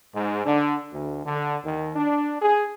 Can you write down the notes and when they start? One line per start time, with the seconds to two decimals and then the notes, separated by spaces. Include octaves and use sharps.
0.13 G#2
0.45 D3
0.92 D2
1.24 D3
1.63 D#2
1.95 D4
2.41 G#4